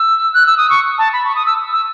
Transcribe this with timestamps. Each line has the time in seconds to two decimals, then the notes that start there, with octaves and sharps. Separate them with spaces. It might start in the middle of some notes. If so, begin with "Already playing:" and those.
Already playing: E6
0.34 F#6
0.46 E6
0.57 D#6
0.70 C#6
0.98 A5
1.13 B5
1.25 C#6
1.35 D#6
1.46 E6
1.72 E6